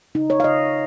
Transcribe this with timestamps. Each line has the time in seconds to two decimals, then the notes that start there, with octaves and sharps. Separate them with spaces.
0.15 C#3 D#4
0.30 C#5
0.40 F5
0.44 C#3 D#5